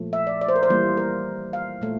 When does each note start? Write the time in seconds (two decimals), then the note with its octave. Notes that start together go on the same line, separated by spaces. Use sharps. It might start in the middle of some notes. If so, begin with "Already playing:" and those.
Already playing: A#2 F3 A3
0.13 E5
0.27 D5
0.41 D5
0.49 C5
0.56 A#4
0.63 C5
0.70 E3 G3 A#3
0.97 A#4
1.53 F5
1.81 A#2 A3